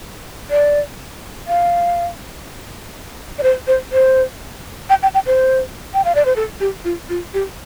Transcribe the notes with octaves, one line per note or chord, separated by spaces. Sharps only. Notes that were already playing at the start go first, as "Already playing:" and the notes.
D5
F5
D5
C5
C5
C5
G5
G5
G5
C5
G5
F5
D5
C5
A4
G4
F4
F4
G4